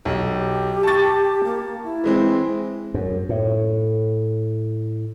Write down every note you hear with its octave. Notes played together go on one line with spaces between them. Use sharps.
B1 G4
A5 C#6 A6
A#3
E4
E3 G#3 C4
F#2
A2